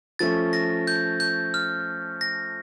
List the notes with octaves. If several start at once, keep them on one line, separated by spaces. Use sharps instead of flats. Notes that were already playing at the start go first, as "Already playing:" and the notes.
F3 A3 C#4 A6
A#6
G6
G6
F6
A#6